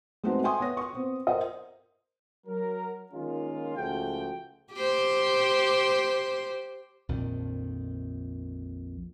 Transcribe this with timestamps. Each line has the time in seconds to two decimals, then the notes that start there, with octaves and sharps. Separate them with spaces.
0.24 G#3 A3 B3 C4 D#4 F#4
0.44 E5 G5 G#5 C6 C#6 D#6
0.60 B3 C#5 A#6
0.77 C#6 D#6
0.93 B3 C4
1.27 A#4 C5 D#5
2.47 F#3 A#4
3.12 D#3 G#3 A#3 C#4 F4
3.77 C#2 F3 A3 F#4 G#4 G5
4.73 G4 C5
7.09 A#1 F2 D#3